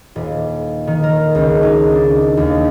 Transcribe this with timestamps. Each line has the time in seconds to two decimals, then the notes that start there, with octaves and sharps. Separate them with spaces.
0.16 D#1
0.87 D#3
1.04 A#4
1.35 C#2
1.63 D#4
1.95 D4
2.37 D#2